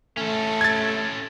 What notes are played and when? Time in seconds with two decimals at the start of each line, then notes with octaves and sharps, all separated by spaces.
0.17 A3 C#4 A4
0.61 G#6 A6